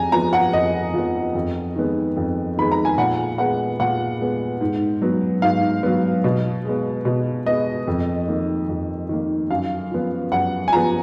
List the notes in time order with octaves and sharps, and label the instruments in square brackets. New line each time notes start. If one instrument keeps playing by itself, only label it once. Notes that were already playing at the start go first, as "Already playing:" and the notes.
Already playing: [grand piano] F2 G#5 A#5
F3 B3 A#5
F#5
F2 D#5
F3 B3
F2
D#3 G#3 B3
F2
D#3 G#3 B3 B5
A#5
G#5
A#2 F#5
G#3 B3 F#5
A#2 F#5
G#3 B3
G#2
F#3 B3
G#2 F5
F#3 B3
B2
G#3 B3
B2
G#3 B3 D#5
F2
D#3 A#3
F2
D#3 A#3
F#2 F5
F3 B3
F#2 F#5
G#5
F3 B3 A#5